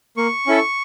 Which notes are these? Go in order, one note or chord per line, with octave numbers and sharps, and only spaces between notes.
A#3 C#6
C#4 E4 A4